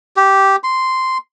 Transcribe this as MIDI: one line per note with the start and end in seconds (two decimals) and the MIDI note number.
0.17 0.56 67
0.64 1.18 84